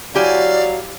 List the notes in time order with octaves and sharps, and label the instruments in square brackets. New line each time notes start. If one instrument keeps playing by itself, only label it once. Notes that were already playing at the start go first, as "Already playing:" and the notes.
[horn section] F#3 F5 [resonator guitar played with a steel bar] E4 G4 G#5 [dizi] D5